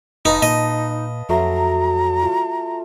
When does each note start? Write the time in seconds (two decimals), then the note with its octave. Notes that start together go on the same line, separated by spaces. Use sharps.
0.25 F1 D#4 B4 D#5 F5 A5
0.42 A#2 D#4 D#5
1.29 F2 F#3 A3 A#5 C6
2.23 F4